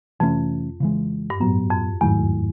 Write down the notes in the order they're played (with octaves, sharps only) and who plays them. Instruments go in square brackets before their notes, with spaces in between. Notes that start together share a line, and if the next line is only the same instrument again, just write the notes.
[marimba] F2 [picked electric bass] C3 E3 A3 C#4
[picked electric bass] C#3 E3 G#3
[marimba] G2
[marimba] F#2 [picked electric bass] A2 F#3 B3
[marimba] F2
[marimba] E2 [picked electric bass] G#2 D#3 F#3 A3